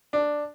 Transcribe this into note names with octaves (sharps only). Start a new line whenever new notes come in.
D4